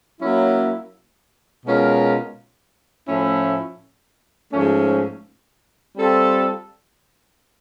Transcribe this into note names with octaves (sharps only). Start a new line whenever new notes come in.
F#3 A#3 C#4 E4
B2 G#3 C#4 F4 A#4
A2 F3 A3 C#4 E4
G#2 F3 A3 C#4
G3 C4 F4 A4